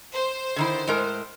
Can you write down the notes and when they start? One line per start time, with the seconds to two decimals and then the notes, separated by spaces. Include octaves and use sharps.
0.13 C5
0.56 D3 D#3 E4
0.87 A2 G#3 A#4